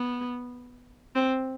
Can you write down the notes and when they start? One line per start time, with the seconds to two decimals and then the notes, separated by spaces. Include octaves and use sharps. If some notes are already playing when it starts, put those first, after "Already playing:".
Already playing: B3
1.15 C4